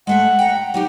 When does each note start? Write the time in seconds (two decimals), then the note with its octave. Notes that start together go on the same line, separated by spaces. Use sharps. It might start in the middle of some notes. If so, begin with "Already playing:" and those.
0.07 G#3 A3 E5 F#5
0.39 G5 A#5
0.74 F#3 D#4 G4 G5